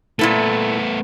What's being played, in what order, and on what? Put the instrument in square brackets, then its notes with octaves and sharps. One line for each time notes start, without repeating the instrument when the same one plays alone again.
[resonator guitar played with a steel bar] A#2 E4 A4 [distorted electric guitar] A3 B3